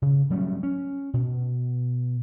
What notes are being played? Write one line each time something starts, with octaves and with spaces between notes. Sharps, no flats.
C#3
F#3 G3 A3 C#4
C#4
B2